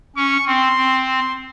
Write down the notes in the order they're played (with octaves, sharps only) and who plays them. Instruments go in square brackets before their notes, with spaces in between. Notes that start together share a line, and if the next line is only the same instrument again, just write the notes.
[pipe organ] C#4 [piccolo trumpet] C#6
[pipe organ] C4 [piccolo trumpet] C6
[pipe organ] C4
[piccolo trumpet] C6